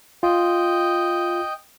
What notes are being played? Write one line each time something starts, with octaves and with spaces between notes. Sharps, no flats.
F4 D#5 G5